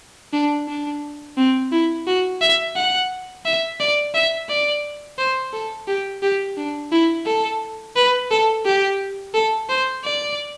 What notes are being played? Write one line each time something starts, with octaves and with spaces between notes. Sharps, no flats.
D4
D4
C4
E4
F#4
E5
F#5
E5
D5
E5
D5
C5
A4
G4
G4
D4
E4
A4
B4
A4
G4
A4
C5
D5